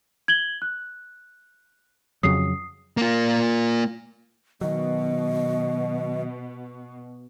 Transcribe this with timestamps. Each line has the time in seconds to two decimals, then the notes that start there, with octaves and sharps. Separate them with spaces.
0.28 G#6 F#7 G7
0.62 F#6
2.23 F2 C#3 F#3 D#6 C7
2.97 A#3 F4
4.61 B2 D#3 F#3 D#5